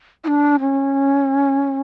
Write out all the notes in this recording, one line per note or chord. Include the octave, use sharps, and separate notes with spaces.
E4
D4
C#4